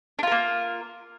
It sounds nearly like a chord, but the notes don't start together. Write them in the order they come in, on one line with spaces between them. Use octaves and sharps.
D4 F4 A#4 A#3